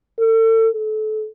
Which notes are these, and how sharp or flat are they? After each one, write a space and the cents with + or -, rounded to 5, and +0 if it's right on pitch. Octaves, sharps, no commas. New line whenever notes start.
A4 +35
A4 -30